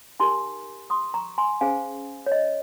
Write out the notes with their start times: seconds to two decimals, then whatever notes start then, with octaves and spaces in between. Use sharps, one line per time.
0.20 D#4 G4 A#4 G#5 C6
0.90 C6 D#6
1.14 A#5 C#6
1.38 G#5 C6
1.61 C#4 G#4 C5 F5 G#5
2.26 C#5
2.32 D#5